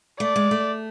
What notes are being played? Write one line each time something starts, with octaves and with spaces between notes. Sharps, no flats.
A3 D5
G#3
A3